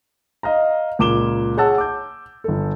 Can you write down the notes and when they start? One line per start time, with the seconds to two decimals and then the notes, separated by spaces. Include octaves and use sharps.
0.43 D#5 F5 A#5
0.99 C#2 A#2 D6 E7 G7
1.57 G#4 C#5 F#5 A5 E6
1.78 D6 G6
2.44 G1 A4